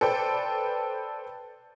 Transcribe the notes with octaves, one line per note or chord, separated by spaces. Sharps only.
A4 B4 C5 D5 G5